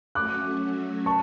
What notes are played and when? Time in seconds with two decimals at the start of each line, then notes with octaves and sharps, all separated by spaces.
0.15 F#3 A3 C#4 F#4 D6 F#6
1.06 A5 C#6